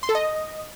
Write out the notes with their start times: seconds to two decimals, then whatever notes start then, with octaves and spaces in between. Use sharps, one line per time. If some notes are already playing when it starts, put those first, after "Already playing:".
0.03 C6
0.09 A4
0.15 D#5